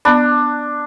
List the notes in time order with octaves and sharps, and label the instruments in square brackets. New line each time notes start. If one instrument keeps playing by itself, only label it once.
[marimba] B3 B5 [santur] D4